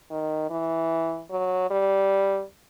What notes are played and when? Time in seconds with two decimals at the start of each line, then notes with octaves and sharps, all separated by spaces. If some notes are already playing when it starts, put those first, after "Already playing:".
0.10 D#3
0.50 E3
1.30 F#3
1.70 G3